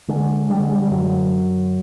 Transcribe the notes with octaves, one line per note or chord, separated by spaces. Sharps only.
D3 G#3
D3 G3
G#3
G3
G3
F#2 F#3